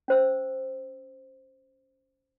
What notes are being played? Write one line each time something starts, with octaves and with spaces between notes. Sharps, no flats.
C#4 C5 E6